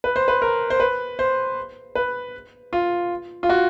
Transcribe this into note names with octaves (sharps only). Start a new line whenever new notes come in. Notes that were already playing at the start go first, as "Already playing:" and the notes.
B4
C5
B4
A#4
C5
B4
C5
B4
F4
F4
F#4